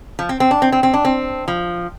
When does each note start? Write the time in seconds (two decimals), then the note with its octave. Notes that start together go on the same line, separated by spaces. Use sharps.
0.19 F3
0.29 C4
0.40 C4
0.51 D4
0.62 C4
0.72 C4
0.83 C4
0.94 D4
1.05 C4
1.48 F3